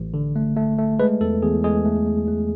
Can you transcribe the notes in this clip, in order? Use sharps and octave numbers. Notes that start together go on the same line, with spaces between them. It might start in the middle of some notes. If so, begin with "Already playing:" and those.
Already playing: A1
D3
A3
A3
A3
G#3 B4
E2 A4
E2 G#4
G#3 G#4
A3
A3
A3